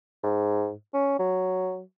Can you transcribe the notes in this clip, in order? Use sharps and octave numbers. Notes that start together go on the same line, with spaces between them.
G#2
C#4
F#3